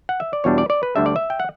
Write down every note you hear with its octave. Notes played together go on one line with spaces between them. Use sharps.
F#5
E5
D5
E2 B2 G3 D4 C#5
D5
D5
B4
D2 D3 G3 D4 E5
D5
E5
G5
F#5